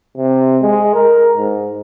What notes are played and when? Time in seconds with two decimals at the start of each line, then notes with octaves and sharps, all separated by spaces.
0.16 C3
0.62 G#3
0.95 A#4
1.37 G#2